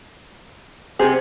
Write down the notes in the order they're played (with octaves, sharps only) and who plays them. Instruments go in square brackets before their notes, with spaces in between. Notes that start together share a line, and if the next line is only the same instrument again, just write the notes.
[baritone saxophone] C3 [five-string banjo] G#4